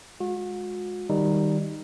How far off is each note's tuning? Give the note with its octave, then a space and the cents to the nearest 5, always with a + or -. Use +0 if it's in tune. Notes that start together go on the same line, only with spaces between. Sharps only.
G#3 +0 F#4 -40
D#3 +0 G3 +0 D#4 -5